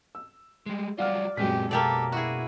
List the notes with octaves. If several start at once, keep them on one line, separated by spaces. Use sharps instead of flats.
E6
G3 G#3
F#3 G3 F4 D5 F5 F#5 F6
F#2 A#2 G#3 B3 C4 G4 B6
B2 A#3 G4 A4 D5
E4 F#4 G#4